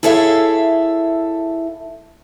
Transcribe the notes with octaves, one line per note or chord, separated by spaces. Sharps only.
E4 G#4 A4 C#5 E5 F5